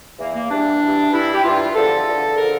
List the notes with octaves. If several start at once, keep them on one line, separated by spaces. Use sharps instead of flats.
E2 E3 A#3
A#3
G2 E3 D4
G2 E3
G2 E3 E4
G4
G2 E3 F4
E2 D3 F3 A4
E2 D3 F3
D3 F3 A#4